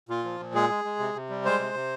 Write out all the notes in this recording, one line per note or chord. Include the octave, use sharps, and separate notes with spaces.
A#2 F4
F3
A#2
G#3 G#4
G#3
G#3
C3
C3
G3
G#3 C5
C3
C3